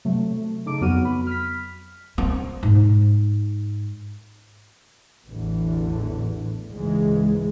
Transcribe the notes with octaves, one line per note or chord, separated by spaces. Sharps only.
C3 F#3 A3
A3
C#3 D#4 A4 D6 D7
F2 F#3 B3 F#4 F6 D#7
B5
F6 B6
C4
G#2
A1 E2 A2 D3 E3
C#2 G#2 E3 G#3